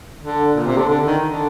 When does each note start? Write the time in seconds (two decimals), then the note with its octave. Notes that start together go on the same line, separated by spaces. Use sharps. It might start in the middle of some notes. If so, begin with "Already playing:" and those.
0.22 D3
0.56 A#2
0.66 C3
0.77 D3
0.89 D3
1.06 D#3
1.22 D3